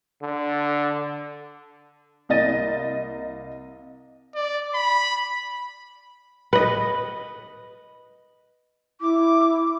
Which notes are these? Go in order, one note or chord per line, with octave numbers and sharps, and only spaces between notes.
D3
C2 A#3 D#5 A6 D#7
D5
B5
B4 D#5
E4 D6